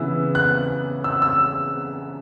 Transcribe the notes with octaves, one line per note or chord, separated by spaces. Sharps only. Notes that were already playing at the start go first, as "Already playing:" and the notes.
Already playing: C#3 E3 B3 E6
F#6
E6
E6